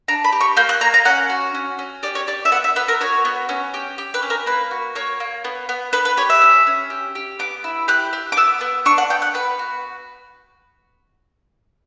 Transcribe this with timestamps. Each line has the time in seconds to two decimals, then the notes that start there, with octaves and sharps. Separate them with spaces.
0.08 D4 A#5
0.24 B5
0.32 G4
0.40 C#6
0.57 A#3 G6
0.69 F#6
0.81 A#3 A#5
0.94 A#5
1.05 C#4 F#5
1.30 F#4
1.54 C#4
1.79 C#4
2.03 G4 D5
2.15 C#5
2.27 G4 D5
2.45 E5
2.52 B3 F#5
2.64 E5
2.76 B3 B4
2.88 A#4
3.01 F#4 C#5
3.25 B3
3.49 C#4
3.74 G4
3.98 G4
4.14 B4
4.22 C#4
4.30 A#4
4.46 A#3 B4
4.71 F#4
4.95 A#3 C#5
5.20 A#3
5.44 B3
5.69 B3
5.93 B3 B4
6.05 B4
6.17 G4 C#5
6.30 E5
6.42 C#4
6.67 C#4
6.90 G4
7.15 G4
7.39 B3 D6
7.64 E4
7.88 G4 F#6
8.13 G4
8.32 D6
8.37 B3 E6
8.61 B3
8.85 D4 C#6
8.98 F#5
9.10 B3 G5
9.22 F#5
9.34 B3 B4
9.59 F#4